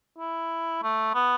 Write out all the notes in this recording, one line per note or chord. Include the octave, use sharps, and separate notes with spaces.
E4
A3
B3